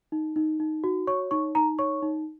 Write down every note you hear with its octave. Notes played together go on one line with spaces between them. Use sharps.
D#4
D#4
D#4
F#4
C#5 C#6
D#4 C#6
D#4 A#5
C#5 C#6
D#4